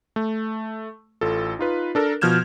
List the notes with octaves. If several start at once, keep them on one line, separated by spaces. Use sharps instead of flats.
A3
A1 F4 A4
D#4 F4 B4
D4 A4 A#4
B2 F3 F6 G6 G#6 E7